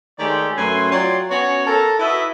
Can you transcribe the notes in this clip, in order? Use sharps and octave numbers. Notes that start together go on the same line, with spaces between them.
D#3 G#3 A3 G4 C#5 D5
F#2 A3 B4 G#5 C6
F#3 F4 C#5 D5 G5 C6
B3 C#4 F#4 C#5
A4 A#4 A5
E4 F#4 B4 D#5 E5